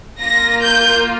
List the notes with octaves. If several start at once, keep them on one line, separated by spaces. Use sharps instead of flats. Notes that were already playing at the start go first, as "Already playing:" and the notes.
A#3 F4 A#6
G6